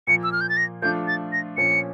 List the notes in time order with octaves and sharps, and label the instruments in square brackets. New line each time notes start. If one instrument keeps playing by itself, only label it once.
[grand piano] A#2 F3 A#3 [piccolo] C#7
[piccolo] E6
F6
G6
A6
A#6
[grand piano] F3 A3 D4 F4 [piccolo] G6
[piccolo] A6
A#6
[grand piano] A#2 F3 C#4 [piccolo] C#7